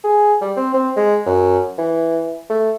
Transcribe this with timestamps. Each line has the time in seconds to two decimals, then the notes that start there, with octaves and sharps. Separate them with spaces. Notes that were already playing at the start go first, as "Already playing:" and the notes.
0.04 G#4
0.41 G3
0.57 C4
0.74 C4
0.96 G#3
1.26 F#2
1.78 E3
2.50 A3